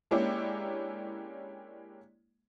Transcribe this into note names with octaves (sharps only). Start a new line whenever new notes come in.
G#3 A#3 C#4 D4 E4 G4